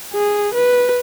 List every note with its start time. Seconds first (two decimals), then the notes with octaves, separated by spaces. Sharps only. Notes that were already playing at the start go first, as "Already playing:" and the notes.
0.13 G#4
0.54 B4